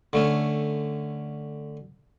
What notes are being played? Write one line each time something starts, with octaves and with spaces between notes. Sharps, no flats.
D3 A3 C#4